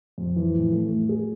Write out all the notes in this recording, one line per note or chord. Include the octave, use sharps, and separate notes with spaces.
F2
E3
A2
A3
A3
G#4